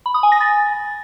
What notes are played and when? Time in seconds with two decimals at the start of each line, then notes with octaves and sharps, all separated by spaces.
0.06 B5
0.14 D#6
0.23 G#5
0.32 A#6
0.41 A6